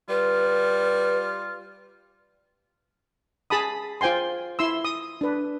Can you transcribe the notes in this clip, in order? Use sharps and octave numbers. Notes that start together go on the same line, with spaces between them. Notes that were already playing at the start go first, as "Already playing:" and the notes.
G3 F4 B4
G#4 A5 B5 D#6
F4 C5 G5 G#5 C6
E4 C6 E6
D#6
D4 B4